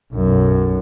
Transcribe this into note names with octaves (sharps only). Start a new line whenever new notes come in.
B1 F#2